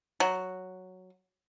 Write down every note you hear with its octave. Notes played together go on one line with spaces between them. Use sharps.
F#3